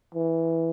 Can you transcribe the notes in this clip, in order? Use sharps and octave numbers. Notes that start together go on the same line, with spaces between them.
E3